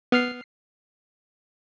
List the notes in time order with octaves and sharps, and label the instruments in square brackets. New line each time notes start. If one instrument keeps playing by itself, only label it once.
[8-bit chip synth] B3 F6 C7